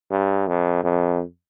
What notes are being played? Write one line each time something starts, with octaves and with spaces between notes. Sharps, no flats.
G2
F2
F2